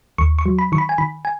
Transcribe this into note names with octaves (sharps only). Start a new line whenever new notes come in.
D#2 C#6
C#6
F#3
B5
D#3 C#6
B5
G#5
D#3 B5
G#5